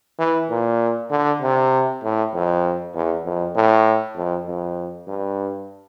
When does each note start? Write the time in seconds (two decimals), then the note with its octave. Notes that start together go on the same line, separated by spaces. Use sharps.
0.19 E3
0.50 A#2
1.11 D3
1.42 C3
2.03 A2
2.33 F2
2.94 E2
3.25 F2
3.55 A2
4.16 F2
4.47 F2
5.08 G2